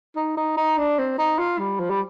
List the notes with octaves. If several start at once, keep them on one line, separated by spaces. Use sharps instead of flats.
D#4
D#4
D#4
D4
C4
D#4
F4
G3
F3
G3